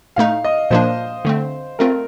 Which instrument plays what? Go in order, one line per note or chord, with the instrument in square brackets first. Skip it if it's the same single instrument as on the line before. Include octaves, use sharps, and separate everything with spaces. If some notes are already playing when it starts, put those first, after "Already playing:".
[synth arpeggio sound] A2 A3 D#4 [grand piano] F5
[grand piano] D#5
[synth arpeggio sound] A#2 F3 A#3 D4 [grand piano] C5
[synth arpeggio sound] D3 A3 C4
[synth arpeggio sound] A3 C4 F4 [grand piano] A#4